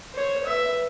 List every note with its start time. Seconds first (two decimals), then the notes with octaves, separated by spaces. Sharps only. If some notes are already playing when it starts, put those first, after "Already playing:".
0.13 C5 C#5
0.43 B4 E5